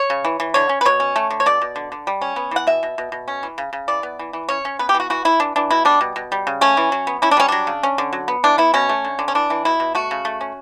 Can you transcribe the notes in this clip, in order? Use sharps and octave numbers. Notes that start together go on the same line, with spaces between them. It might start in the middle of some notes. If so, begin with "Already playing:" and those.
Already playing: C#5
C#3
E3
E3
D3 C#5
C#4
B4
B2 C#5
C#4
A3
D3
C#5
B2 D5
B2
D3
D3
G3
C#4
B3
E3 F#5
B2 E5
B2
B2
B2
C#4
E3
C#3
C#3
E3 D5
B3
E3
E3
C#4 C#5
C#4
B3 B4
G4
E3
F#4
E3 F#4
E3 E4
E3 D4
E3 D4
B2 E4
G3 D4
B2
B2
G3
C#3
A3 C#4
E3
F#3
B3
C#4 E4
D4
G3 C#4
F#3 D4
C#3
C#4
D3
F#3
B3
E3 D4
B3 E4
B2 C#4
A3
D3
D3
C#4
E3 D4
E3
B2 E4
B2
A3 F#4
C#3
A3
C#4